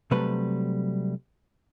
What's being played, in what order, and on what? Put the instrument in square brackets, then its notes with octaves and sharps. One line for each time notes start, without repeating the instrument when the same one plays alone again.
[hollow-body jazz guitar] C3 F#3 G3 A3 B4